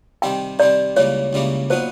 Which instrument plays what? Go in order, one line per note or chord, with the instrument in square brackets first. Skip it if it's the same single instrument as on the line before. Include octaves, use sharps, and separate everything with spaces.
[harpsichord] C3 D#3 G3 C4 [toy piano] G5
[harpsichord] C3 D#3 G3 C4 [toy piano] D5
[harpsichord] C#2 C#3 E3 G3 A#3 [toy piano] C#5
[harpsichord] C#2 C#3 E3 G3 A#3
[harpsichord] A#2 F#3 B3 D#4 [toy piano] C5